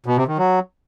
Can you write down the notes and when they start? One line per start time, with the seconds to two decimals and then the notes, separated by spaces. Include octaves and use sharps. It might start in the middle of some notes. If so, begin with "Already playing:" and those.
0.06 B2
0.17 C3
0.28 D#3
0.38 F#3